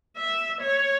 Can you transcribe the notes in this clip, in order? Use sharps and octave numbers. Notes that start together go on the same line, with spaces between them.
E5
C#5